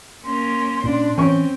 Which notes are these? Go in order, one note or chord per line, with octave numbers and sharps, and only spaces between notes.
A#3 C#4 C6
A#2 C#4 D4
E3 C4 C#4 C#6